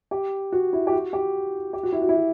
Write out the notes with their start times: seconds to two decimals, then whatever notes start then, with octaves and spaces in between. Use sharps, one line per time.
0.11 G4
0.52 F#4
0.73 E4
0.87 G4
0.92 F#4
1.13 G4
1.73 G4
1.83 F#4
1.92 E4
2.02 F#4
2.09 E4
2.14 F#4